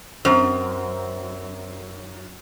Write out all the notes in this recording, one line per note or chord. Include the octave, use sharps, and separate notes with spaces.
F#2 C4